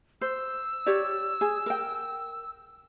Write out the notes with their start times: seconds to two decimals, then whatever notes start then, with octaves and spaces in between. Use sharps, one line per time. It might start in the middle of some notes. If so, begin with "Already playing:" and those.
0.21 C5 E6
0.86 G4 C#5 D5
1.41 G#4
1.66 A#4 G5